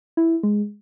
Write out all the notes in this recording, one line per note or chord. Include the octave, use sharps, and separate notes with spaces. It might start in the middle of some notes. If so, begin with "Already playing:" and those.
E4
G#3